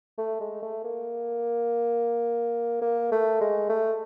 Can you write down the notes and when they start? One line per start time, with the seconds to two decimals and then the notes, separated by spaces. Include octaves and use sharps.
0.18 A3
0.40 G#3
0.62 A3
0.84 A#3
2.81 A#3
3.12 A3
3.41 G#3
3.69 A3